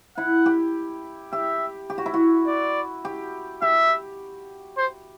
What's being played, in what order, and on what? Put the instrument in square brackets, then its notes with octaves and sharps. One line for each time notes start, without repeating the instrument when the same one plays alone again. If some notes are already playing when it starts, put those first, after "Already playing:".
[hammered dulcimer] E4 [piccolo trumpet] F#5
[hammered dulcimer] G4
[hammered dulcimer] G4 [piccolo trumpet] E5
[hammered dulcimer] G4
F#4
E4
F#4
[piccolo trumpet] D5
[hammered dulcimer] G4
[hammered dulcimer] G4 [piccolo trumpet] E5
[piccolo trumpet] C5